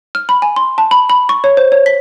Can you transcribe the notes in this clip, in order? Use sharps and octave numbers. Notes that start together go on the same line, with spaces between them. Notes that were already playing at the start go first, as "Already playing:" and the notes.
F6
B5
G#5
C6
A5
B5
B5
C#6
C#5
C5
C#5
B6